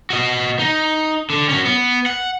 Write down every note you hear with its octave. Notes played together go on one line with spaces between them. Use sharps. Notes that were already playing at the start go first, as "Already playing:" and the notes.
F#4 D#5
D#4
D3
C#4 F#4
B3
F#5